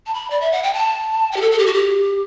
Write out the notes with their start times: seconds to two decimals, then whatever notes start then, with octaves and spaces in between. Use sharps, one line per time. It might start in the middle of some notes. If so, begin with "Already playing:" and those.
0.06 A5
0.14 B5
0.30 D5
0.41 E5
0.52 F#5
0.63 G5
0.73 A5
1.32 G5
1.36 G4
1.41 A4
1.51 A4
1.58 G4
1.66 F#4
1.73 G4